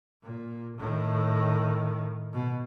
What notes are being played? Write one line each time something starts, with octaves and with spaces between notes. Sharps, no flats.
A#2
A2 D#3
B2